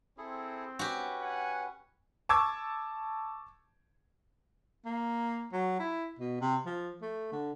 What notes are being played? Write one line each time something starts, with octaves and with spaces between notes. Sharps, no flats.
C4 E4 G#4 A4
C#4 F#4 G4 B4
F#5 G#5
A5 C#6 D6 E6 G#6
A#3
F#3
E4
B2
C3
F3
A3
D3